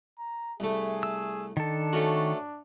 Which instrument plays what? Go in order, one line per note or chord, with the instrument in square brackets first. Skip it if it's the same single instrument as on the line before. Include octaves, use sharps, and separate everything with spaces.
[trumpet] A#5
[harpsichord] C2 A3 [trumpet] G#4
[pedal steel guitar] E6
[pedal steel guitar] D#3 A4 [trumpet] D4
[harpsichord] A3 C#4 F#4